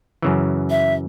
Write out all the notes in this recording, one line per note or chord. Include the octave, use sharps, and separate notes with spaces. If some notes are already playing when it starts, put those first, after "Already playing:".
F#2 C#3 E3
E5